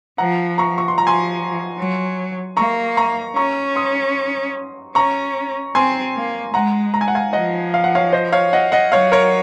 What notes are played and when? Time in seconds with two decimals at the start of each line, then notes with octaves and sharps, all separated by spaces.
0.18 F3 F#5 A#5
0.58 A#5 C#6
0.78 C#6
0.88 C6
0.98 F3 A#5
1.07 G#5 C6
1.78 F#3
2.57 A#3 A#5 C#6
2.97 A#5 C#6
3.36 C#4 A#5 C#6
3.76 C6 D#6
4.95 C#4 A#5 C#6
5.75 C4 G#5 C6
6.15 A#3
6.54 G#3 F#5 A#5
6.94 A#5
7.01 G#5
7.08 F#5
7.15 F5 G#5
7.33 F3 D#5 F#5
7.74 F5
7.84 F#5
7.95 C#5 F5
8.12 C5 D#5
8.32 C#5 F5
8.53 D#5 F#5
8.72 D#5 F#5
8.92 F#3 C#5 F5
9.12 A#4 C#5